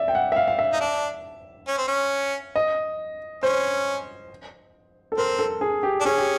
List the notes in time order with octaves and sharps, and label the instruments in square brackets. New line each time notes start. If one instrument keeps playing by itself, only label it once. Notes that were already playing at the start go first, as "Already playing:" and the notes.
Already playing: [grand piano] D5 E5
G5
F#5
E5
F5
F5
E5
[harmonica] D#4
D4
C#4
C4
C#4
[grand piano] D#5
[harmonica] C#4 [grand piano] C5
[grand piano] A4
[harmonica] C4 [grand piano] A#4
[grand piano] A4
G#4
G4
[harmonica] D4
[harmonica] C#4 [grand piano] G#4
[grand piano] G4